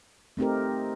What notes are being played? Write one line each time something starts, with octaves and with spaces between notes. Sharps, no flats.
A3 C4 D#4 G4 A#4